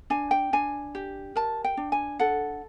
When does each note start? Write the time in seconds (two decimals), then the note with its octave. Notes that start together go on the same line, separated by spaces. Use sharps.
0.10 D4 G#5
0.31 G5
0.53 D4 G#5
0.95 G4
1.35 A#4 A5
1.64 G5
1.77 D4
1.92 G#5
2.19 A4 F#5